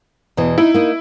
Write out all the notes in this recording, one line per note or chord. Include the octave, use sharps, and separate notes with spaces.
E2 B2 E3
D#4 E4
A#3 D#4